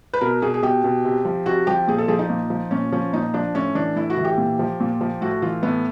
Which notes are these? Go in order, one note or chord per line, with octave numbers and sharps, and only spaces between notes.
B4
B2 A#4
B2 G#4
G#4
B2 G4
B2
C3
F3
C3 F#4
F3 G4
A#2 G#4
A4
F3 G#4
D#4
A#2
F3
A#2 C#4
F3 C#4
A#2 D#4
F3 D4
A2 C#4
E3 D4
A2 E4
F#4
E3
G4
A#2
F3
A#2
F3
A2 F#4
E3 F4
A2 B3